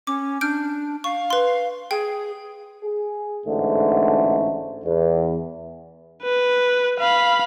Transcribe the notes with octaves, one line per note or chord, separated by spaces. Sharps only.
C#4 D6
D4 F6 G6 D7
F5 C#6
B4 C6
G#4 G5
G#4
A1 G#2 D3 A3
E2
B4
F5 B5